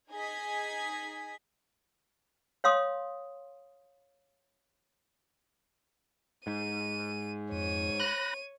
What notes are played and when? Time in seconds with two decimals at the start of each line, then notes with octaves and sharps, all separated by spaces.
0.11 D#4 G#4 D#5 G#5 G#6 B6
2.64 C#5 F5 C6 D#6
6.47 G#2 D#7
7.52 F2 C#5 D#7
8.00 B5 F#6 A#6